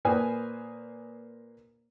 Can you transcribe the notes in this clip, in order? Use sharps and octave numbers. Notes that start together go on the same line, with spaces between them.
A#2 A#3 B4 C5 G#5 D#6